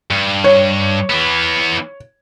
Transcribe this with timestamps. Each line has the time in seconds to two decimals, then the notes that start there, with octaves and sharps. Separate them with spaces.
0.11 G2
0.44 C#5
1.10 E3 B3